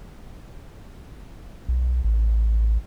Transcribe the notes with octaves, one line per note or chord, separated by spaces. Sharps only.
B1
A1